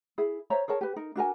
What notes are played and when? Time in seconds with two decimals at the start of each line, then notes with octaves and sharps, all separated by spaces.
0.18 E4 G#4
0.50 C5 C#5 E5 A#5
0.68 G#4 A#4 C#5 A5
0.81 G4 B4
0.96 D#4 A#4
1.16 D4 F#4 A#4 G#5